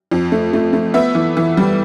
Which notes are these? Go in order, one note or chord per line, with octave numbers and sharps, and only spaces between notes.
F2
A3
A3
A3
B3 E5
E3
E3
G3